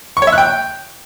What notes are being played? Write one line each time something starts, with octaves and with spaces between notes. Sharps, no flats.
C#6
C#5
E5
F#6
G5